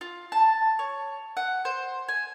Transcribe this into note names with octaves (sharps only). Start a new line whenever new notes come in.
F4
A5
C#5
F#5
C5
G#5